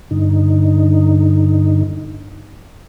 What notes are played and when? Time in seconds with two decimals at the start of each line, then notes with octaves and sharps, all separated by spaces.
0.11 G2 D3 D#4